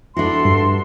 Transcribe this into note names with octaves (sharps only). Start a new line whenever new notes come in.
D4 E4 F#4 A4 F#5 C6
G2